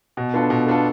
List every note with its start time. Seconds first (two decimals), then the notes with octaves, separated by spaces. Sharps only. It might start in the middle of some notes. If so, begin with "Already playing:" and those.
0.17 B2
0.34 B3 D4 F4 A4
0.50 B2
0.67 B3 D4 F4 A4